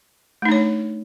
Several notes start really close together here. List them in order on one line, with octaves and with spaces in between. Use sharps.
A3 D#4 D4 C#5